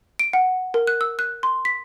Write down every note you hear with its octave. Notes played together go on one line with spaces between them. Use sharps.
D7
F#5
A#4
F#6
E6
F#6
C6
B6